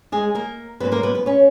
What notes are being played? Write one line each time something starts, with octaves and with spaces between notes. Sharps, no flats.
G#3 G#4
A#3 A#4
G#2 F#3 A#3 B3 C#4 B4
A#3 A#4
B3 B4
B3 B4
C#4 C#5